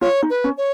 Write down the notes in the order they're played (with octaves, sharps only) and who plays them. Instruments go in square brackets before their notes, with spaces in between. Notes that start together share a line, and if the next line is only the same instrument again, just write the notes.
[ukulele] F4 [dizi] C#5
[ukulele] D#4
[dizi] B4
[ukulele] C#4
[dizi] C#5